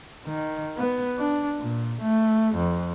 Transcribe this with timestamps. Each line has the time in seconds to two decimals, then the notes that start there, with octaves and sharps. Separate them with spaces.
0.26 D#3
0.77 B3
1.18 D4
1.59 A#2
2.01 A3
2.55 F2